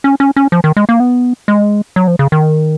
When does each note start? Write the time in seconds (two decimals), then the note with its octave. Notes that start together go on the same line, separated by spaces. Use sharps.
0.04 C#4
0.20 C#4
0.36 C#4
0.52 F3
0.64 D#3
0.77 G#3
0.89 A#3
1.00 B3
1.48 G#3
1.96 F#3
2.07 F3
2.19 C#3
2.32 D#3